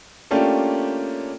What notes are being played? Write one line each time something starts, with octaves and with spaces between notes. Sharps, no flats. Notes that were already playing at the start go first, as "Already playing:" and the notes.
A3 A#3 C#4 D4 F4 G4